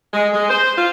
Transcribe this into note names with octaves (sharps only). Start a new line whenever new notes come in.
G#3
G#3
C5
F4